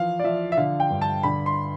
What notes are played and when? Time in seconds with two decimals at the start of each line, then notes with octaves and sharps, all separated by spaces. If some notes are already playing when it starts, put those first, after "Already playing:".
Already playing: E3 F3 F5
0.20 D5
0.24 F3 E5
0.52 E5
0.57 D3 F5
0.80 G5
0.91 G2
1.02 A5
1.23 D3 B5
1.46 C6